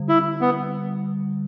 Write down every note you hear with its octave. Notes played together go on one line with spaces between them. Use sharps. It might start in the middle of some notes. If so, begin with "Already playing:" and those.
Already playing: D3 G3
E4
B3